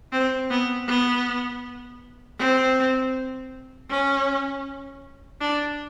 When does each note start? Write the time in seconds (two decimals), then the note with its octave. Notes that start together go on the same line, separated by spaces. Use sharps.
0.12 C4
0.50 B3
0.88 B3
2.39 C4
3.90 C#4
5.41 D4